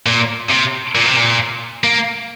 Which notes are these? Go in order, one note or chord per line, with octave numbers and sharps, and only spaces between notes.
A#2
C3
A#2
C3
A#2
A#3